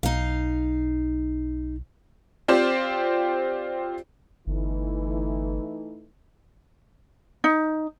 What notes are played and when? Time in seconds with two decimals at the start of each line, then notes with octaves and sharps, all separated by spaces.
0.03 B1 D#4 F5
2.48 C4 F4 G4 C5 D5
4.47 G1 E3 A3 D#4
7.44 D#4